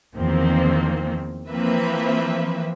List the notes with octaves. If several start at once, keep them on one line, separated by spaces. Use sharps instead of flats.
E2 D#3 F3 A#3 C4
E3 F3 A#3 C4 B4 E5